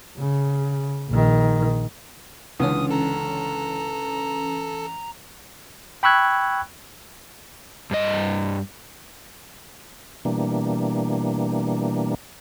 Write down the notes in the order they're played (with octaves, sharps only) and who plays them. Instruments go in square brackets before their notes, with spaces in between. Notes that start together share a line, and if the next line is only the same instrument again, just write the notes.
[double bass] C#3
A#1 D#3
[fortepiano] C#2 D3 [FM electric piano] E3 C#4 [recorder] D#6
[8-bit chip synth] A4 [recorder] A#5
[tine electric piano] G5 B5 C#6 E6 F#6 G#6
[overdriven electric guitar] G2 D#5
[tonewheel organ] B2 E3 G3 A#3 D4